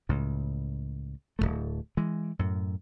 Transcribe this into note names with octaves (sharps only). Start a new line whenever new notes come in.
C#2 A2 C#3
D1 E2 A3
E3 G#3
F#2 A2